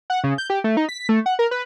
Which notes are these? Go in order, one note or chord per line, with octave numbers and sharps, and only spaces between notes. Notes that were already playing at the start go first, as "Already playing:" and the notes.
F#5
C#3
G6
G4
A3
D#4
B6
A3
F#5
A#4
B4